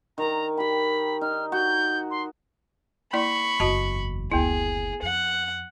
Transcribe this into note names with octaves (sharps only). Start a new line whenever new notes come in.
D#3 A#4 A#5
G4 G5 B5
D#4 F6
F#4 G6
C6
A#3 E4 D5 B5 C#6
F#1 E2 F#4 D#5 A5
F#1 D2 B3 E4 G#4
F2 F#5